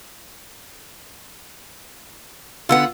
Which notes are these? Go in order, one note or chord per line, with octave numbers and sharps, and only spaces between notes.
D3 B3 F4 F#5 E6